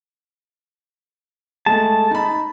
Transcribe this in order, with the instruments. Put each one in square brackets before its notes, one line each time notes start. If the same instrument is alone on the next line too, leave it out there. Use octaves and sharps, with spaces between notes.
[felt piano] G#3 A3 [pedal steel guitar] A5
[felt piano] D#4 B5